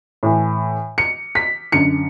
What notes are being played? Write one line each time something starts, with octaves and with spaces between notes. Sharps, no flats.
A2 E3
C#7
B6
F#2 D3 C#7